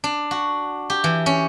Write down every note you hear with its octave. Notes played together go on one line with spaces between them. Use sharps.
D4
F#4
G4
E3
C#4